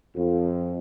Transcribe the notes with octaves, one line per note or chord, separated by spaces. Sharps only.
F2